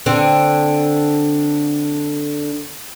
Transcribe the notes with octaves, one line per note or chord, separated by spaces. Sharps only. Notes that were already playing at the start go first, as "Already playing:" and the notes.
D3 C4